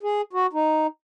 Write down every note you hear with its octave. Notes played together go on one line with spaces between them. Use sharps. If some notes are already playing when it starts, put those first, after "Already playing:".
G#4
F#4
D#4